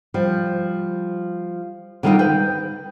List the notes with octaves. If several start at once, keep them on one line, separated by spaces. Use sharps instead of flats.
F3 G3
D3 D#3 G3 F4 D#5 G5
B4 G5